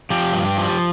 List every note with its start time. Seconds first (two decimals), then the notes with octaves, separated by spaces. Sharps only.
0.10 F3 G4
0.33 G2
0.57 F3